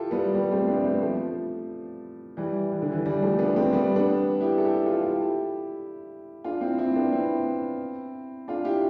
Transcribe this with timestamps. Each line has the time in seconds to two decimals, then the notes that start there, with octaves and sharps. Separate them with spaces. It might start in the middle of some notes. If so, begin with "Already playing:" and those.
Already playing: E4 F4 G4 A4
0.11 G3 B3
0.33 G3 B3
0.52 A3 C4
0.68 B3 D4
0.84 A3 C4
1.01 F3 A3
2.37 E3 G3
2.72 E3
2.82 D3
2.92 E3
3.06 E3 G3
3.22 F3 A3
3.39 B3 D4
3.56 A3 C4
3.73 G3 B3
3.96 B3 D4
4.41 E4 G4
4.58 A4
4.64 E4 G4
4.86 F4 A4
5.08 E4 G4
6.44 D4 F4
6.61 C4 E4
6.78 C4 E4
6.96 B3 D4
7.13 C4 E4
8.48 D4 F4
8.65 E4 G4